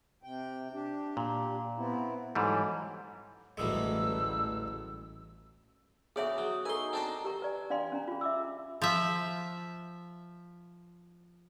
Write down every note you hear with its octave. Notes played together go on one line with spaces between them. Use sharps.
C3 G5
D4 G4
A#2
B3 C4 E4
G#2 E3 F#3 G3 A4
A1 D2 G3 G#3 E6
D2 B3 F#4 G#4 C#5 D5 E5
F#3
D#4 A4 A#4 G#5 C6 C#6
C4 D4 C5 A5 A#5
G4 A#4 A#5 C#6
B4 D5 G#5
D4 D5 F5 G#5 C6
C#4 D4 A#5
F4 G#4
E5 D6 E6
F3 E5